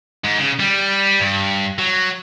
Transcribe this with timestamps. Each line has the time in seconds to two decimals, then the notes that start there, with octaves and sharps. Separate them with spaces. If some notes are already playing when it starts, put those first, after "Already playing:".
0.24 G#2
0.39 C#3
0.60 G3
1.20 G2
1.79 F#3